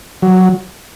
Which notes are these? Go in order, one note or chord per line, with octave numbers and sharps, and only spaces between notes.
F#3